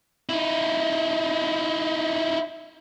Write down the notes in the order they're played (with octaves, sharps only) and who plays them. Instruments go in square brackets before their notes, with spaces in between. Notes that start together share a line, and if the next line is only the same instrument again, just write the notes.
[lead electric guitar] D#4 E4